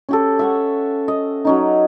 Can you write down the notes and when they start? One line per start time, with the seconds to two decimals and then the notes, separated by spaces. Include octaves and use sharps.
0.09 C#4 G4 A4
0.39 E5 F#5 C#6
1.08 D#5
1.45 F#3 C#4 D#4